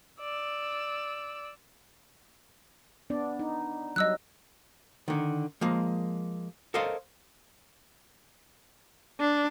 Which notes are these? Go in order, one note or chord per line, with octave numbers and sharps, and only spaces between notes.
D5 E6
B3 D4 D5
D#4
F#3 G3 D#5 E6 F#6
D3 D#3
F3 G#3 A#3
A4 A#4 C5 C#5 D#5 F5
D4